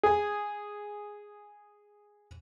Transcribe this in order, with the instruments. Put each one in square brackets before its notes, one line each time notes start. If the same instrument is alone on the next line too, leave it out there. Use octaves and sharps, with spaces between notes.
[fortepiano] G#4 G#5